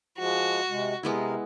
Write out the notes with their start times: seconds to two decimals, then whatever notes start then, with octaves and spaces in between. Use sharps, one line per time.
0.18 F3 G#3 F#4
0.69 C3 G#3
1.03 C3 G#3 B3 E4 A#4